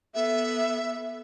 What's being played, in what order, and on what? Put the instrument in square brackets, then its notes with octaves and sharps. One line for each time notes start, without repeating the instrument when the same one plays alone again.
[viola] B3 A4 [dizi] E5